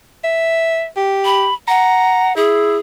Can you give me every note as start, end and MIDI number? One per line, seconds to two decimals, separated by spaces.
0.24 0.86 76
0.97 1.48 67
1.25 1.54 83
1.68 2.35 78
1.68 2.30 82
2.36 2.78 64
2.36 2.78 68